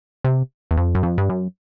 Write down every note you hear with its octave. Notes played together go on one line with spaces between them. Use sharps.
C3
E2
F2
F#2
F2
G2
F#2